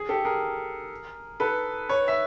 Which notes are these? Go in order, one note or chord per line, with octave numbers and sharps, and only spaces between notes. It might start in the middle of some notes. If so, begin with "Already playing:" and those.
Already playing: G#4
G4 A4
G#4 A#4
A4 B4
B4 C#5
E5